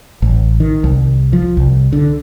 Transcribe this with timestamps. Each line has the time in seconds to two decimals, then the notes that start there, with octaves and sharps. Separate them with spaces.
0.22 A1
0.60 D#3
0.84 C2
1.33 F3
1.57 C2
1.93 D3